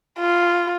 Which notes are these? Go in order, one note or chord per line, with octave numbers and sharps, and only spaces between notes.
F4